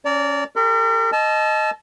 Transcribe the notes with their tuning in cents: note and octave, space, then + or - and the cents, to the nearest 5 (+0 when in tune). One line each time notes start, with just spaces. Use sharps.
C#4 +0 D5 -25 A#5 -40
G4 +35 A#4 -40 B5 +35
D#5 +0 A5 -25 E6 +40